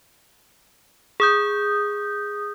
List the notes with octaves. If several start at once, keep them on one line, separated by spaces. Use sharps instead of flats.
G#4 D#6 G6